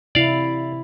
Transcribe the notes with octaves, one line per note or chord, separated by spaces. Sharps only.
C3 E4 D5 F5